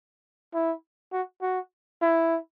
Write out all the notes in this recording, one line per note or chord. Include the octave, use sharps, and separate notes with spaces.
E4
F#4
F#4
E4